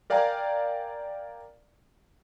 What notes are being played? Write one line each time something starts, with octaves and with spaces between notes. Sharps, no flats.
A#4 D5 F5 G5 G#5 A#5